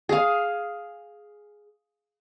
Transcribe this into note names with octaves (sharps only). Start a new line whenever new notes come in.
G#4 F5